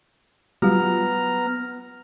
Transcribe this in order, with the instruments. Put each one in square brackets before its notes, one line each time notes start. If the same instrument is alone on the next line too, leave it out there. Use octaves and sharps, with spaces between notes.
[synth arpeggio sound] F#3 G3 F4 [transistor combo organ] B3 A#5 F6